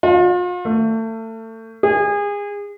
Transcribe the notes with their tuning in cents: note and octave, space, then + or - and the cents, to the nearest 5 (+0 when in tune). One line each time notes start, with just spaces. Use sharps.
F4 +40
A3 +30
G#4 -30